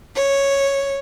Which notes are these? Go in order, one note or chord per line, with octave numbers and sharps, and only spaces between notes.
C#5